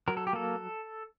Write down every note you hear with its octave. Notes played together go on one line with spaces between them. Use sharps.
F#3 A#4
A4
G4
A#3 A4